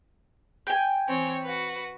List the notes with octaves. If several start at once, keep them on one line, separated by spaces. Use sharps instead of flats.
G5 G#5
E3 C4 C#5
F#4 B4